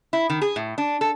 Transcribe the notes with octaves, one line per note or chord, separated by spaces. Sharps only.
E4
D#3
G#4
A2
D4
A4